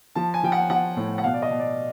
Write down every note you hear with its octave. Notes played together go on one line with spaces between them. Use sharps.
F3 A5
G#5
F3 G5
F#5
F3 F#5
A2
F#5
B2 F5
D5
D#5
B2
D5